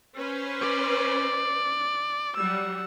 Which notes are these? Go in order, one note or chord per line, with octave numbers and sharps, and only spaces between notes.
C#4 B4 C5
D5
F#3 G3 F#5 E6